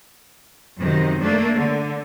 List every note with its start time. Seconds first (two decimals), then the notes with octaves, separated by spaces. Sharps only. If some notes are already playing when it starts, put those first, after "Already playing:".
0.78 F#2 C3 D#3
1.20 A3 A#3 D4
1.55 D3